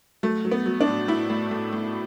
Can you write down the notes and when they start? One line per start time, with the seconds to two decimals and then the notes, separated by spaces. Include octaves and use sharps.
0.23 F#3 A3
0.45 F#3
0.51 B3
0.66 F#3
0.81 D4
0.87 A2
1.08 A2 E4
1.30 A2
1.51 A2
1.73 A2